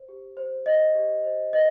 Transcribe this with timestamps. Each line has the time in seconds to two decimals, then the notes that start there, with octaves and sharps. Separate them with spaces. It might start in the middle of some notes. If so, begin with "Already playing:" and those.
Already playing: C5
0.09 G4
0.37 C5
0.66 C5 D#5
0.95 G4
1.24 C5
1.53 B4 D#5